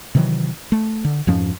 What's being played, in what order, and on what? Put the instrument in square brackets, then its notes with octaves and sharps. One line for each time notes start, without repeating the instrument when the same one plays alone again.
[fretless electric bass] C3 D#3 E3 F#3
A3
D3
F2 G#2 F3 C#4